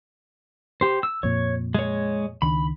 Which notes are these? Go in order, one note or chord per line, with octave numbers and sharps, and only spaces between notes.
G4 C5
E6
F2 A#2 C#5
G#3 C#5
C#2 D#3 D4 B5